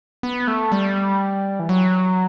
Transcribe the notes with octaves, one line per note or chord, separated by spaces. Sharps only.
B3
A3
G3
E3
F#3